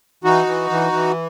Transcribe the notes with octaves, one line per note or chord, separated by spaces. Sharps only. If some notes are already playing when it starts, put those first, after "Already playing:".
E3 D#4 F#4
E3
E3
E3